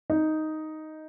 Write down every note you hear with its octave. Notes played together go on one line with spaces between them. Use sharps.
D#4